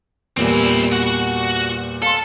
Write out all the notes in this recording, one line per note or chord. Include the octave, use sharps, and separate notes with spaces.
E2 A#2 G3 C4 E4
F#4 F#5
A4 F5 C6